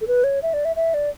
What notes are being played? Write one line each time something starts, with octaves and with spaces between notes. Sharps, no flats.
A4
B4
C#5
E5
D5
E5
E5
D5